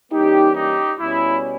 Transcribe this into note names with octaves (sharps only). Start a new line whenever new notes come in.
E3 G3 A#3 C#4 D#4 G4
D#4 G4
B2 G3 C#4 E4